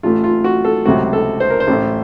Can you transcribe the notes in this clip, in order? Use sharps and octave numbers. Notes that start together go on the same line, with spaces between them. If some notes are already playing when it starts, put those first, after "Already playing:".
A1 A2 A3 F4
F4
F#4
A4
C#2 C3 F#3 A3 F#4
A4
C5
A#4
C5
A1 A2 A3